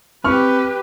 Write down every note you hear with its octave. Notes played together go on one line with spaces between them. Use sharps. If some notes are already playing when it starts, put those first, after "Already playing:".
C4 G4 B4 C#6 F6